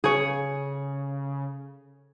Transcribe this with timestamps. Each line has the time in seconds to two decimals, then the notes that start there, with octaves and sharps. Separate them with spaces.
0.04 C#3 G#4 C#5